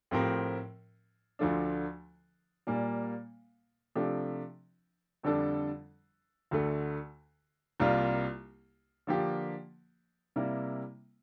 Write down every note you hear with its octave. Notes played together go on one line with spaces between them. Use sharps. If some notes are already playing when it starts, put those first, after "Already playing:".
A2 F3 C4 G4 A#4
D2 D3 F3 A3 D4
A#2 G3 A#3
C3 F3 A3 D4 G4
F2 D3 G3 D4 A4
D2 D3 A3
C2 C3 G3 A#3 F4
D3 F3 A#3 D4 G4
C3 G3 A#3 E4